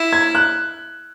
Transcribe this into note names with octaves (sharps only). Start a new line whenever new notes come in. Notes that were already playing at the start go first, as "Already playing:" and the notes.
Already playing: E4
G#6
F#6